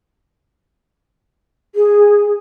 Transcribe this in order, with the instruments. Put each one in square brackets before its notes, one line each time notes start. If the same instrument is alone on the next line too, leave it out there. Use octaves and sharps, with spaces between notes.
[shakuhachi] G#4